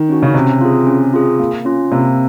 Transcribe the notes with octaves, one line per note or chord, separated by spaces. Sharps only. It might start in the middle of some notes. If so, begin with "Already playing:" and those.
Already playing: D#3
C#4 F#4
C#3
C3 C#4
F4 G#4
C#4
F4 G#4
A#3
C#4 F4
C3 A#3